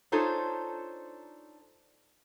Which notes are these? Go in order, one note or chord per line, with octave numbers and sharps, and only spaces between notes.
D4 D#4 F4 A4 C5 C#5